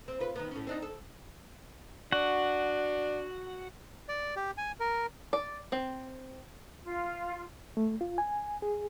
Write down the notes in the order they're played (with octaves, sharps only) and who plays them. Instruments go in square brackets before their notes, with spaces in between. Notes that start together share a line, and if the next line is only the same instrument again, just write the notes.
[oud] C4
F4 B4
D#3 B3
A2 C#4
C4 D4 D#4
A4
[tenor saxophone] D4 [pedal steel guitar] F#4 F#5
[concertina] D5
G4
G#5
A#4
[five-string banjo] D5
C4
[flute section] F4
[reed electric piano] A3
F4
G#5
G#4